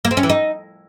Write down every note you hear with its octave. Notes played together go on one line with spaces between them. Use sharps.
A#3
C4
C#4
E3
D#4